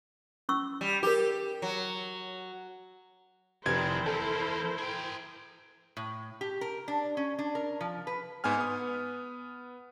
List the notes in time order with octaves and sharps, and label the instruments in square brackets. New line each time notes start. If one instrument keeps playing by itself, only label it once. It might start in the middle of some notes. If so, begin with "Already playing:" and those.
[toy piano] C#4 C#6 E6
[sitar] G3
[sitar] G4 [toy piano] G#4 A#4
[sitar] F#3
[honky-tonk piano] F1 [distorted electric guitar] D#3 [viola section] E4 A#4 C5 [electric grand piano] G#6
[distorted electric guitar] E2 A#3 [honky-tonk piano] A4
[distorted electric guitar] G#4 G5
[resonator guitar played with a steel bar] A2
G4
A#4
D4
C#4
D4
A#4
F3
B4
[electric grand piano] G#2 B3 G#5 F6
B3 D#6